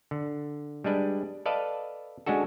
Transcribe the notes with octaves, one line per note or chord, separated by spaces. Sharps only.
D3
G3 G#3 D4 B4
A4 B4 D5 D#5 F5 A5
G#3 C#4 D4 F#4 A4